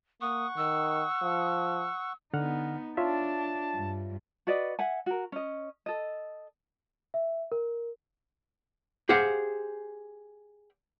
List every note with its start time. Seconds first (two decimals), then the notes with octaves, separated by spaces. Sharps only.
0.21 A#3 F#5 C#6 D#6
0.57 D#3 E6
1.22 F3
2.34 D3 B3 D#4 F#5 F6
2.97 D4 F4 C#5 E5 A5
3.74 G2
4.47 F#4 B4 D5 D#5
4.79 E5 F#5 G#5
5.06 F#4 A#4
5.32 C#4 D#5
5.86 A4 D#5
7.14 E5
7.52 A#4
9.09 G4 G#4 C5 F5 F#5